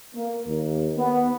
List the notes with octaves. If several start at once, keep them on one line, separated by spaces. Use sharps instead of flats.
A#3
D#2
B3